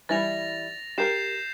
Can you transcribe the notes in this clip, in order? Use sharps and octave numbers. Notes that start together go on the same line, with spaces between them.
E3 G3 E4 A6 A#6 F7
G4 A#4 G6 C7 E7